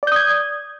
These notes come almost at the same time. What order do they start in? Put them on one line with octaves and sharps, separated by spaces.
D5 G6 D#6 G#6